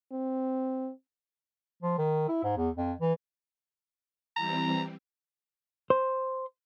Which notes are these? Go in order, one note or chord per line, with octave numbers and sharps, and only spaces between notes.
C4
F3
D#3
E4
G#2
E2
F2
E3
E3 G3 C4 A#5
C5